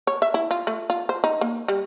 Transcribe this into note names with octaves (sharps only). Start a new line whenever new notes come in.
C#5
E5
E4
F4
A3
F4
C5
D#4
A#3
G3